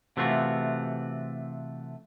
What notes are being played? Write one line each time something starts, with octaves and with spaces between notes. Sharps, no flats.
C3 E3 A3 F4 F#4